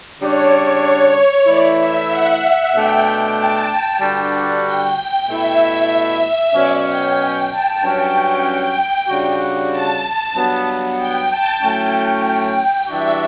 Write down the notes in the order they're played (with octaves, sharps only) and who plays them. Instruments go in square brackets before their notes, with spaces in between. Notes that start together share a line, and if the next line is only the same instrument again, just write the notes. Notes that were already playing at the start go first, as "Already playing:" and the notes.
[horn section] C#3 G3 D4 [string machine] C#5
[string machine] C#5
[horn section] E3 A3 E4 [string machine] D5
[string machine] E5
F#5
[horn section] B2 A3 D4 [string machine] G5
[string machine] A5
[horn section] G2 D3 G3 D4 F#4
[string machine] G5
[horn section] B2 A3 E4 [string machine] E5
[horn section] B2 F#3 C#4 [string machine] D5
[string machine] G5
G5
A5
[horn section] G2 F#3 C#4 F#4 [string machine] G5
[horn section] C#3 G3 D4 F#4
[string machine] A5
[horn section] G2 F#3 B3
[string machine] G5
A5
[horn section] A2 F#3 A3 C#4 [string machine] G5
[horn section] E3 G3 D4 F#4 [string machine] E5